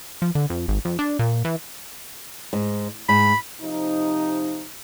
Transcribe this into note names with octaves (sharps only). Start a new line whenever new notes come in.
F3
D3
F2
G#1
F2
D4
A#2
E3
G#2
G#2 B5
C3 F3 D#4